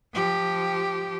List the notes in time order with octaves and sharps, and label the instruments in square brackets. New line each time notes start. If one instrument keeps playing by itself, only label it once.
[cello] F3 G4